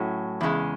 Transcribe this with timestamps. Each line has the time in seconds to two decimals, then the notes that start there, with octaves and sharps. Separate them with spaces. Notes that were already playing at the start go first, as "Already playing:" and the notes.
Already playing: A2 F#3 C#4
0.41 E2 C#3 G#3